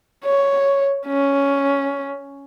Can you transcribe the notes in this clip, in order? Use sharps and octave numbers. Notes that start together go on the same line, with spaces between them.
C#5
C#4